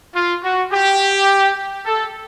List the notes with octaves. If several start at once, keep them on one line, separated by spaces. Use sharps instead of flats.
F4
F#4
G4
A4